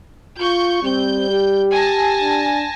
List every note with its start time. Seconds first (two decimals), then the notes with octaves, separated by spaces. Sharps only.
0.39 F4 C#6 G6
0.83 G3 C4 G6
1.29 G4
1.72 G#5 A5 A#6
2.20 D4